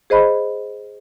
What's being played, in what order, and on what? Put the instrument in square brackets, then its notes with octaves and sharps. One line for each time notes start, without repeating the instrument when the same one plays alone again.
[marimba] G#4 C5 D#5 B5